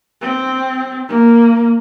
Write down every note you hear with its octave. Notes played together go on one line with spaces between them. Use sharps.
C4
A#3